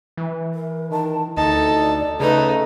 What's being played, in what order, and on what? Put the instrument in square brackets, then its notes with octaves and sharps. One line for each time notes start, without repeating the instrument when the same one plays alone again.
[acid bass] E3
[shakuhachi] A#4
[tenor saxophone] D#3 [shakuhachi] A5
[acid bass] D2 [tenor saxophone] D#4 [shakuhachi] E4 [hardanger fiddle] A4 A5
[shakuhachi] D5
[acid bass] C#3 [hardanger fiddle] A3 D#4 [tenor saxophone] G#4 [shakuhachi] B4